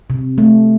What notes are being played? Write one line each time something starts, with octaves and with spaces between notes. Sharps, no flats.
C3
A3